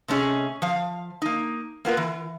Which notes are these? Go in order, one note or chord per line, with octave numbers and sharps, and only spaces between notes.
C3 A3 C#4 G#4 D#5
F3 F5
A#3 D#4
A#3 B3 F4 A#4
E3